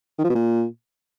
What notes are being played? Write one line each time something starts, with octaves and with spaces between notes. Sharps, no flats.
D#3
F3
B2
A#2